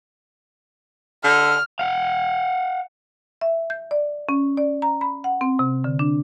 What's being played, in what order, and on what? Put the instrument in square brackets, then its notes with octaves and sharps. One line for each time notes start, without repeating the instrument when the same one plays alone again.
[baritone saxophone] D3 [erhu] F6
[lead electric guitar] F5 F#5
[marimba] E5
G6
D5
C#4
D5
A#5
B5
F#5
C4
C3
D3
D4